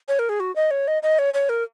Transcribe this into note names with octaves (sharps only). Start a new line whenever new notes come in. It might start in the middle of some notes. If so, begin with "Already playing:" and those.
C#5
A#4
G#4
F#4
D#5
C#5
D#5
D#5
C#5
C#5
A#4